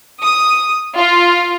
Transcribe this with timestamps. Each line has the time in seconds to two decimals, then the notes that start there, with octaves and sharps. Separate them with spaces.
0.22 D#6
0.96 F4